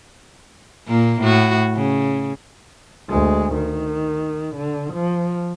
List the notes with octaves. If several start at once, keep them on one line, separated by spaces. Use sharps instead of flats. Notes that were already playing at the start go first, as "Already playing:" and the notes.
A#2 A#3
A2 F#4
C#3
D2 G#3
D#3
D3
F3